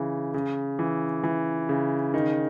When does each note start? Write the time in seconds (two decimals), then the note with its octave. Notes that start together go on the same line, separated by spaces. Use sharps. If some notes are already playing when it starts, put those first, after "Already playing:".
Already playing: C#3 E3
0.34 C#3
0.79 E3
1.24 E3
1.69 C#3
2.14 D#3